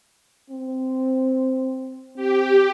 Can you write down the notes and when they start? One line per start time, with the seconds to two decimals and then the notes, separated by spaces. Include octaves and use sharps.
0.50 C4
2.16 C4 G4